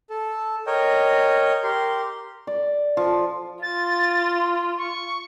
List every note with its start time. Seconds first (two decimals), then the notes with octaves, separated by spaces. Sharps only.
0.10 A4
0.67 A#4 C#5 D#5 G5
1.63 G4 A#4 C6
2.47 D5
2.97 F3
3.62 F4 A6
4.78 C#6